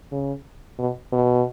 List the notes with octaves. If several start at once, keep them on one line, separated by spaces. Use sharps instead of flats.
C#3
B2
B2